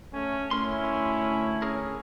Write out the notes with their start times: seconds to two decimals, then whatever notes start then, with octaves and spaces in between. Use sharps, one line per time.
0.13 A3 C#4
0.51 D2 A3 C#4 E4 A#4 C6
1.62 C#4 G#4 A#4